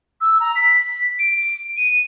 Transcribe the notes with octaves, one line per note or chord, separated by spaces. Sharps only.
E6
A#5
B6
D7
D#7